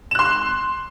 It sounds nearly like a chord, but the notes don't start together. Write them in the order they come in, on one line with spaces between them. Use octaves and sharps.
E7 F#6 C6